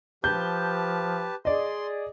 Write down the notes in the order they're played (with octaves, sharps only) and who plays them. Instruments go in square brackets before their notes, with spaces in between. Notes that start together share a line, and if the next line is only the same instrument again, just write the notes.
[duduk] F3 [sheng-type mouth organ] G4 B4 A5 [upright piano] G6
[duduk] G#4 [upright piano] D5 D#5 [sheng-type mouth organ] C6